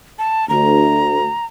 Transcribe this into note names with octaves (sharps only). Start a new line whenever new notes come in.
A5
D2 A#5